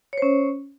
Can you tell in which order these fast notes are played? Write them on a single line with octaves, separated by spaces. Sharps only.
C#5 C5 C#4